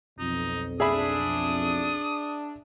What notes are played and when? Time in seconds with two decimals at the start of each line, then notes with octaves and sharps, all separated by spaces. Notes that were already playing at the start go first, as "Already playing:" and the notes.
0.19 B1 F2 D#4
0.80 D4 G#4 E5 B5 D#6